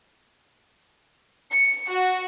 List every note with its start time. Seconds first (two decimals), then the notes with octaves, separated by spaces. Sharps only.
1.52 C#7
1.90 F#4